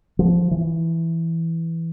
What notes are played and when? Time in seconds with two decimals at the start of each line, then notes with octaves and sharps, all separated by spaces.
0.19 F3
0.51 E3